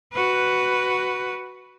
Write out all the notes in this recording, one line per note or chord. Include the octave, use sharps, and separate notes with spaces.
F#4 B4